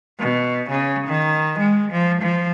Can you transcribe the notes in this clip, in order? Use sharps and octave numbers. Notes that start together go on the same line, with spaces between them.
B2
C#3
D#3
G#3
F3
F3